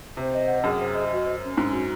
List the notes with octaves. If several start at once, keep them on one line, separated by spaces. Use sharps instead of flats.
C3 C5
D#5
F#5
F#2 G#4
C5
D#5
F#4
C5
C#4
G#2 C#4
F#4